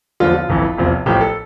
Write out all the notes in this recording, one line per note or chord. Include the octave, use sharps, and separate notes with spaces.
E2 D3 F3 F4
F4
G1 F2 E3
E1 E2 C3 F3
A1 A2 F3 G4
A4